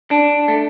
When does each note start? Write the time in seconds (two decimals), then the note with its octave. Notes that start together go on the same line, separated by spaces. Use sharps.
0.11 D4
0.48 A3